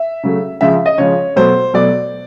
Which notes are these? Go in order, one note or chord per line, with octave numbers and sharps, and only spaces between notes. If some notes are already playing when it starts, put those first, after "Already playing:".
Already playing: E5
C#3 F#3 A3
C#3 F3 G#3 E5
D#5
C#3 F3 G#3 C#5
B2 F#3 A3 C5
B2 F#3 A3 D5